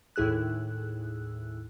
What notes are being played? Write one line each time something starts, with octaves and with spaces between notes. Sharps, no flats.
D#2 A2 E4 G#4 E6 F#6